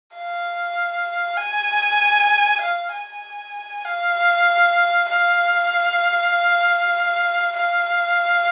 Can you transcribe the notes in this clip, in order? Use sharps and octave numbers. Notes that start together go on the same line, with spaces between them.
F5
G#5
F5
G#5
F5
F5
F5